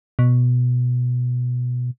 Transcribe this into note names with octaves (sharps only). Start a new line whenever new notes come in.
B2